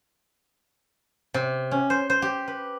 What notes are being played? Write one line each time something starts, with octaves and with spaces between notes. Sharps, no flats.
C3
C#4
C5
C5
G4
B4